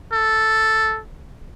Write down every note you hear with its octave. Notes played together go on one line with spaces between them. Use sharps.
A4